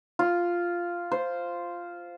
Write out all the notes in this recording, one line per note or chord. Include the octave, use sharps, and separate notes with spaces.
F4
C5